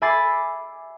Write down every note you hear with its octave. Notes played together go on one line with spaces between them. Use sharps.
E5 G#5 B5 D6 A6 C7